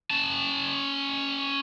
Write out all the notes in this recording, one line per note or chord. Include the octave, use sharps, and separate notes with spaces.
C#4 A5